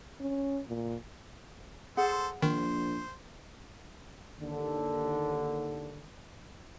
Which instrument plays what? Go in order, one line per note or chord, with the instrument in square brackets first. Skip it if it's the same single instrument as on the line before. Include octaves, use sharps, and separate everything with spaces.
[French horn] C#4
A#2
[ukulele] G#4 F#5 [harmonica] A4 C5
[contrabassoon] A#1 [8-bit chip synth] D#3 [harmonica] C5
[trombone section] D#2 D3